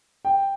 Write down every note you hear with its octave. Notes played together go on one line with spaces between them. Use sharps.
G5